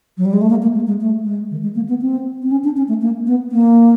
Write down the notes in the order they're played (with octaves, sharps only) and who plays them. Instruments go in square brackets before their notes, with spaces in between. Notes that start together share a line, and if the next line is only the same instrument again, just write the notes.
[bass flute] F#3
G3
G#3
A3
A#3
A#3
G#3
G#3
A3
G#3
D#3
G#3
A#3
B3
C4
C4
C#4
D4
C#4
A3
A#3
B3
A#3